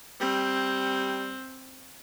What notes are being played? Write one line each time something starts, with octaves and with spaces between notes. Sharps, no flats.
G3 C4